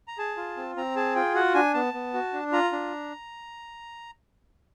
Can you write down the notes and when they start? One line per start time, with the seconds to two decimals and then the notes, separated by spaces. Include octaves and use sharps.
0.08 A#5
0.18 G#4 A5
0.37 F4
0.57 C4
0.76 C4 A#5
0.96 G#4 A5
1.15 F4 G5
1.35 F#4 F#5
1.55 D4 G#5
1.74 B3 A5
1.94 B3
2.14 F#4
2.33 D4
2.52 F4 A#5
2.72 D4